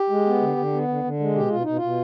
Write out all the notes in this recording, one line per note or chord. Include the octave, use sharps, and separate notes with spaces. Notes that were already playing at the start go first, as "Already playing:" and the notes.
Already playing: G4
G#3
B3
D3
D3
B3
D3
D3
G#3
B2 G4
B2 F4
B2 D#4
F4
B2